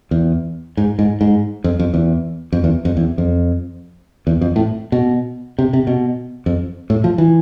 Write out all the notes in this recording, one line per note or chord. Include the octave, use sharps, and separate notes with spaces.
E2
G#2
G#2
G#2
F2
F2
E2
F2
E2
F2
E2
F2
E2
F2
A2
B2
C3
C3
B2
F2
A2
F3
E3